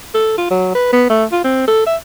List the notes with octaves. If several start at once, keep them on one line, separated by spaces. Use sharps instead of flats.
A4
F4
F#3
B4
B3
A3
F4
C4
A4
E5